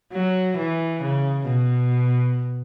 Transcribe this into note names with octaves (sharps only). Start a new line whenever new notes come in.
F#3
E3
C#3
B2